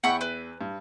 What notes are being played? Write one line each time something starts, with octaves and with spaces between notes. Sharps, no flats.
E2 E5 F#5 G5 B5 C#6
B4
G2